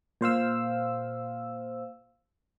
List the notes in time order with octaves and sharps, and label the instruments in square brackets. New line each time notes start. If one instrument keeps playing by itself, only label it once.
[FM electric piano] A#2 C5 F5 E6